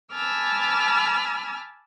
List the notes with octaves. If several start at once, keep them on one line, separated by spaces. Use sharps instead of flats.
G#5 A5 B5 D6 E6 F6